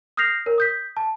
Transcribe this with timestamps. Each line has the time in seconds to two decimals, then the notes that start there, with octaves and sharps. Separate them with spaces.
0.17 D#6 F6 G6 A#6 C7 F7
0.46 A#4 C#5
0.58 D#6 G6 B6
0.97 A5